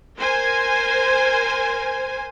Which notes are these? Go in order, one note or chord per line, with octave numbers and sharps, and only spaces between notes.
A#4 C5 G#5